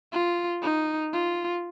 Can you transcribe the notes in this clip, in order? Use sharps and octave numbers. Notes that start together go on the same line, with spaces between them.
F4
D#4
F4